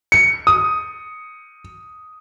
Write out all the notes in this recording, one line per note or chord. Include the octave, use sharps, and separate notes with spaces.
C#7
D#6